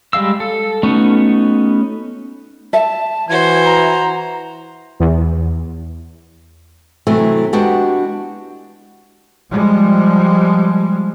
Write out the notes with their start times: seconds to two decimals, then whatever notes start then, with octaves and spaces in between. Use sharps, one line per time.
0.13 G3 G#3 F5 E6
0.40 A4
0.83 A3 B3 C#4 D#4 F#4
2.73 E5 A5
3.29 E3 F#4 C5 G#6
3.65 A#5
5.00 E2
7.07 C3 E3 F#3 A3 C4
7.53 G#3 B3 D4 F#4 G4
9.51 F3 G3 G#3